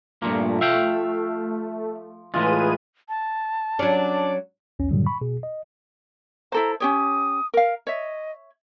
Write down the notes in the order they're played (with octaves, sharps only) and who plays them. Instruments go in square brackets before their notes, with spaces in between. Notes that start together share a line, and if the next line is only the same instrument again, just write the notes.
[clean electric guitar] G2 A#2 A#3 [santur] F3 [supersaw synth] A3
[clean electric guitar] E5 F5 G5
[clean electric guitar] A2 E3 G#3 [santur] F4 [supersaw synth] G#4 B4 D#7
[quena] A5
[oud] F#3 C#4 [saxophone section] D4 D5
[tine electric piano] B1 E2 C#4
G2 A#2 D3 D#3 F#3 G3
B5 C#6
B2 G#4
D#5
[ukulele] E4 A4 C5 [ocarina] A#5
[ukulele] C#4 G4 C#5 [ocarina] D#6
[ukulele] A#4 F5
[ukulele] C#5 E5 [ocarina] D#5